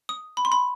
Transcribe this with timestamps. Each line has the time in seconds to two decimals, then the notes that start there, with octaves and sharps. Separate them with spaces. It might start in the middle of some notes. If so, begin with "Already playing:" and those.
0.09 D#6
0.37 B5
0.45 C6
0.52 B5